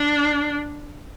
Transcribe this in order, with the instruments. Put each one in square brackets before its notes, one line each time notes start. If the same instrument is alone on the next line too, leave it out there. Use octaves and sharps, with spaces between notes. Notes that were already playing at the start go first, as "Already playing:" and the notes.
Already playing: [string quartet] D4